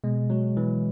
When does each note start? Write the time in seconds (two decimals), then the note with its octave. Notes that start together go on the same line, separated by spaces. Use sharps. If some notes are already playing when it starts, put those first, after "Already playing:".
0.04 B2 G#3
0.30 F#3 G#3
0.57 B2 E3